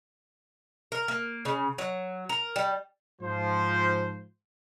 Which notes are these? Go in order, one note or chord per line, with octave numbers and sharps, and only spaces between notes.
A#4
A#3
C#3
F#3
A#4
G3
G#2 F3 C5